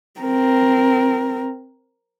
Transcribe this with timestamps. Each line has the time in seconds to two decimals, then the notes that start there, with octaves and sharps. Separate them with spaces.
0.20 C4 A#4